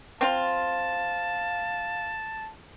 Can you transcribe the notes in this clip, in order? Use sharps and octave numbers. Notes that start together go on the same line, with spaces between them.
C4 F4 F5 A5